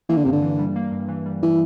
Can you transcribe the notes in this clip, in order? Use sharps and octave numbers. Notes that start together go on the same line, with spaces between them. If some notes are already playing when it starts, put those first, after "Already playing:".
E3 A#3
D3
G2 C3
D3
E3
G3
A#3
G2
E3
G3
E3